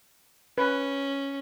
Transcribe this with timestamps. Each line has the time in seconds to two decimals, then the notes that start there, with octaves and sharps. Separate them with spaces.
0.58 C#4 B4